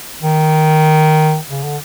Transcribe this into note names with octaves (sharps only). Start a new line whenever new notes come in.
D#3
C#3
D3